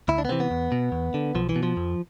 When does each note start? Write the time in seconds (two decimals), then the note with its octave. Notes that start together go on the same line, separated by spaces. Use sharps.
0.08 D2 E4
0.18 D4
0.25 B3
0.29 C3 E3 C4
0.40 B3
0.51 E2
0.72 B2
0.92 E2
1.14 D3
1.35 B1 F3
1.49 E3
1.56 B2
1.63 F3
1.77 F2